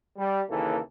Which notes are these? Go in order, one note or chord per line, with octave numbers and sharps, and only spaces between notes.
G3
D#2 C#3 E3 A#3 A4